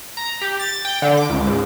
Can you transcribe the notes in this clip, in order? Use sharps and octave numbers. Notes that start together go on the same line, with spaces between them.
A#5
G4
A6
G5
D3
D6
C#2
G#2